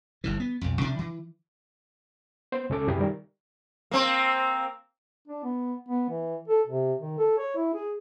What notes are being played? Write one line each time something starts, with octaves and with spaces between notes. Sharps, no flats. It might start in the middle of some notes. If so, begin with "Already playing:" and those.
G1 G2 E3
B3
B1 F2
C3 F3 D4
E3
B3 C5
C#2 C#4 A4 D6
F#2 C3 E3 G4 G#4 B5
D#3 G3 A#4
A#3 C4
D4
B3
B3
E3
A4
C3
D#3
A4
C#5
E4
G#4